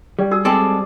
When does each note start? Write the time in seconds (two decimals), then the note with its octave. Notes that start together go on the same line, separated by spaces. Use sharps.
0.19 G3 G4 D5 G5
0.31 F#4 G#4 E6
0.45 G#3 C4 A4 D5